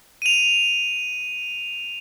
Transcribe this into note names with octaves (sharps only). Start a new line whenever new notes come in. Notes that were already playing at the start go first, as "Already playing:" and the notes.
D#7 F7